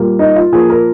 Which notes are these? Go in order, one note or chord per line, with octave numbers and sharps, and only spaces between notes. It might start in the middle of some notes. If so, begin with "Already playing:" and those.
Already playing: A#2 G3 A#3
D#4
F4
A#2 F3 A#3 G#4
A#4